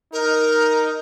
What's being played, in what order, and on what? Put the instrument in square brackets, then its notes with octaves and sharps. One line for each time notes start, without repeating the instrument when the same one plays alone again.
[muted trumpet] D#4 [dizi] A#4